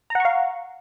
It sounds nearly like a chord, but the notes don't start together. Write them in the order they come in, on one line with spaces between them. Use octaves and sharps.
A#5 F#5 C#6 F5